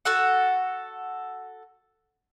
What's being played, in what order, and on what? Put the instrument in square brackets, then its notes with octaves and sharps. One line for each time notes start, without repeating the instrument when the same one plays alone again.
[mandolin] F#4 A4 F#5